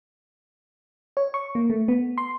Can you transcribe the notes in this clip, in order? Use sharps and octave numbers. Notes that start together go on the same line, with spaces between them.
C#5
C#6
A#3
A3
B3
C6